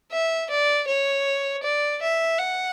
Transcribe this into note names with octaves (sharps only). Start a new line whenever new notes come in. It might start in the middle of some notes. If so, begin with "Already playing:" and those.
E5
D5
C#5
D5
E5
F#5